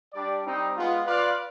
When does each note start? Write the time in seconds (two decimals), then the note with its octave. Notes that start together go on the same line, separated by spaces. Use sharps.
0.14 G3 D4 G4 D5
0.45 G3 C4 D#4
0.76 G#3 B3 F4
1.06 F4 B4 D5 F5